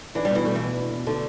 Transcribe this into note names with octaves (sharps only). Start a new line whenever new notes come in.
E3 D4
G3
B2 E3
G3 A3
E3
B2
D4
B2
D3 A3